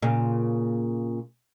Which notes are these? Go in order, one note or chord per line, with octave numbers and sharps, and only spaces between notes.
A#2 C#3